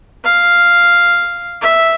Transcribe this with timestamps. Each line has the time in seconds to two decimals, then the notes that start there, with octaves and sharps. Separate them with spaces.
0.24 F5
1.62 E5